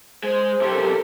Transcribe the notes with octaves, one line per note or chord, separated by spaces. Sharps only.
G#3 C5
B1 C3 G4 A4 A#4